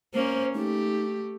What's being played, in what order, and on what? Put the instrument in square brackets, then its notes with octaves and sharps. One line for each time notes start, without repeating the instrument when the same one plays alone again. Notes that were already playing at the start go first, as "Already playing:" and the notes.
[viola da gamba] A#3 C#4 [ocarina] C5
[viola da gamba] A3 G4 [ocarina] D#4